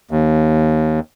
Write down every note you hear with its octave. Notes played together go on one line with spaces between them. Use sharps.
D#2